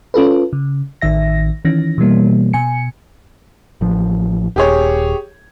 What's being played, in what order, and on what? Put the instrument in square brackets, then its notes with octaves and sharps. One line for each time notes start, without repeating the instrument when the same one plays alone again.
[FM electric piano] C#4 F4 A4 B4
C#3
A1 D#3 E5 A#6
D#3 E3 C#4 A#6
B2 E3 G3 A#3
B2 G#5 C#7
[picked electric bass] A1 F3
[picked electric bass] D#1 [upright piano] G4 G#4 C#5